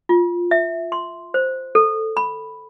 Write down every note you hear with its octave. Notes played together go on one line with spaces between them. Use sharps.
F4
E5
C6
C5
A4
B5